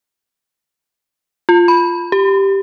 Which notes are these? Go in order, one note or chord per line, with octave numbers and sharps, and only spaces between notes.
F4
B5
G4